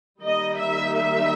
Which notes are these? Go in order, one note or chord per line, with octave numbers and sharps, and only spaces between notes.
D#3 G3 A#3 D#4 D#5
E5
E5